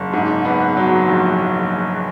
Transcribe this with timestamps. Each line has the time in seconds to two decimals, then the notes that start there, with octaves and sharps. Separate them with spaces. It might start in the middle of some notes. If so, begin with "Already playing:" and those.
Already playing: F#1
0.13 G#2
0.45 B3
0.77 F#3
1.08 A#1